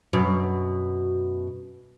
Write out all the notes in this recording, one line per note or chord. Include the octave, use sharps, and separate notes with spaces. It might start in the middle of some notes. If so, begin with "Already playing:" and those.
F#2 B2